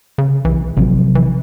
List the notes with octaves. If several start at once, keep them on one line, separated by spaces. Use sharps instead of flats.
C#3
B1 E3
A1 C3 F3 F#3
E3